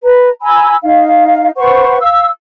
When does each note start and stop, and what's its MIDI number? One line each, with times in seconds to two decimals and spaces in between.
0.04 0.30 71
0.04 0.30 82
0.41 0.76 80
0.41 0.76 82
0.41 0.76 83
0.41 0.76 88
0.83 1.50 63
0.83 1.50 77
1.57 1.98 71
1.57 1.98 72
1.57 1.98 78
1.57 1.98 85
2.00 2.28 77
2.00 2.28 88